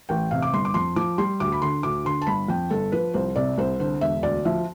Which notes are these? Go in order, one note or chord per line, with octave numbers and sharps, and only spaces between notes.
A1 G5
C3 F5
D6
G1 C6
D6
F2 C6
F3 D6
G3 C6
D2 D6
B5
D3 C6
D2 D6
D3 C6
A5
G1 B5
F2 G5
G1 A4
F3 B4
C2 C5
C3 D5
C2 C5
D3 C5
E1 E5
D2 D5
F3 E5